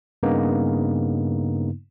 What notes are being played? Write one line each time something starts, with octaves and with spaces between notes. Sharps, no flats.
G2 C#3 A#3 B3 D#4